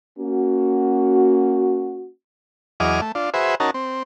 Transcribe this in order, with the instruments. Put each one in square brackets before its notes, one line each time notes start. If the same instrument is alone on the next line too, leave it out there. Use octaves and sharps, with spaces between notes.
[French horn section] A#3 C#4 F#4
[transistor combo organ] E2 F#3 G#4 D#5 D6 F6
A3
D4 F4
F#4 G#4 B4 C5 E5
C#4 D#4 F#4 A#4 A5
C4